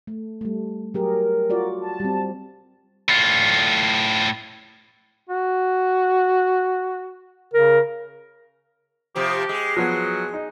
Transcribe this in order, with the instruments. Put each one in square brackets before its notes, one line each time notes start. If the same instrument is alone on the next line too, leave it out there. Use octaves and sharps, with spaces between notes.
[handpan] A3
G3 A3
[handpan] F#3 G4 G#4 [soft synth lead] A#4
[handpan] F4 F#4 D5
[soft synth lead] A5
[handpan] G3 C4
[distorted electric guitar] A2 F4
[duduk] F#4
[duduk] C#3 [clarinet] A#4
[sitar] C3 F3 C4 [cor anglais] G4
[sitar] G#3
[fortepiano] F3 B3 [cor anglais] F#3
[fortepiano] D#4